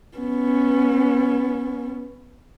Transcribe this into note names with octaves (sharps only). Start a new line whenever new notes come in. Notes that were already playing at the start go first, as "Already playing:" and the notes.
B3 C#4